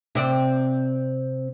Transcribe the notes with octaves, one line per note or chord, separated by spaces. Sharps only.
C3 C4 D5